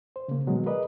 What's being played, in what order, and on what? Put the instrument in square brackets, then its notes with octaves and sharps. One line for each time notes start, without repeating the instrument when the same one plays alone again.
[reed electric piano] C5
C#3 A#3
B2 D#3 F#3 G#3 B3
G#4 A#4 B4 D5 D#5